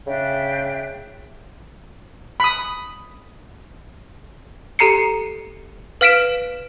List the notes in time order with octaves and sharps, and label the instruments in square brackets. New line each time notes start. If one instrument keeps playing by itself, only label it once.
[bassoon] C#3 [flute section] D4 E5 G5
[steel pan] B5 D#6
[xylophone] G4 A4 A#5 C7 C#7
B4 F5 F6 B6 D7 E7